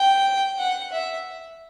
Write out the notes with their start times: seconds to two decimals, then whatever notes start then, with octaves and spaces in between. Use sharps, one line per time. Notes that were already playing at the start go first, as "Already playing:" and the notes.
Already playing: G5
0.58 F#5
0.92 E5